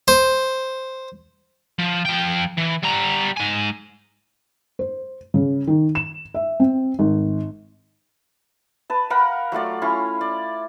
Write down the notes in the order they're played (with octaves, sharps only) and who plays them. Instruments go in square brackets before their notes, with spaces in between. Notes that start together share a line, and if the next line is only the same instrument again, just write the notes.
[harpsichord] C5
[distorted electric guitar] F3
F3 G5
E3
G3 A#5
G#2 G#5
[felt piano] C5
C#3
D#3
E7
E5
C4
G#1
[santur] B4 A5
A#4 F5 F#5 B5
F#3 A3 F4 D5
C#4 E4 F4 C#6
D5